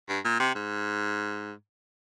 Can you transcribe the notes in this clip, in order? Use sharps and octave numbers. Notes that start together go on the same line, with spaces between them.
G2
A#2
C3
G#2